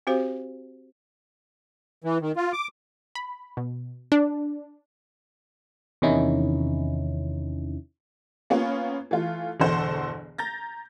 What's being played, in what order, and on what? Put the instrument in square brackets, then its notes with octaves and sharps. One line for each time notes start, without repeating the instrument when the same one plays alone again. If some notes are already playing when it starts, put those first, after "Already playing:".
[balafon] C4 F#4 G4 C5 F5
[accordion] E3
D#3
F4
D6
[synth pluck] B5
B2
D4
[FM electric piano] E2 C3 D#3 C#4 D#4 E4
[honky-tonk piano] A#3 B3 C#4 F4
E3 A3 F4
G1 E2 B2 A4 C5 F#5
A#5 G6 A6 A#6